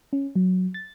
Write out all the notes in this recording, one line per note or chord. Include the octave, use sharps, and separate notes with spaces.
C#4
F#3
A6